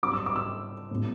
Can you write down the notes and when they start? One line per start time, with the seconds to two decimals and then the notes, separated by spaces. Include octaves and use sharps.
0.03 G2 F#3 C4 D6
0.13 E6
0.26 D6
0.36 E6
0.91 A2 G3 B3